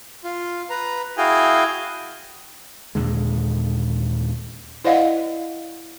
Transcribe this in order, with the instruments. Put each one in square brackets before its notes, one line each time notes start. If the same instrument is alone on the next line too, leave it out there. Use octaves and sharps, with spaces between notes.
[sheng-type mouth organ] F4
B4 A#5
E4 F#4 G#4 F5 G5 G#5
[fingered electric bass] D#2 A#2 D3 G#3
[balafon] E4 C5 D5 D#5 F5 F#5